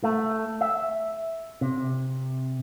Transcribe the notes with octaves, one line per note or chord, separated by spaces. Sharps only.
A3
E5
C3